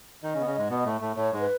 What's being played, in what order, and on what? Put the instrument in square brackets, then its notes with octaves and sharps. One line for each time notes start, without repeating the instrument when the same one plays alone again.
[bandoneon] D#3 D#4 [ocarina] D#5
[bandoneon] C#3 C#4
B3
C#3 C#4
G#2 G#3
B2 B3
A2 A3
A2 A3
[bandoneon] A2 A3 [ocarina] C#5
[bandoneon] G#2 G#3
[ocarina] B4